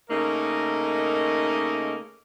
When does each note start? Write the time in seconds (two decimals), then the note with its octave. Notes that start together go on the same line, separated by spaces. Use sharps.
0.10 C#3 A3 A#3 D#4 A#4 D#5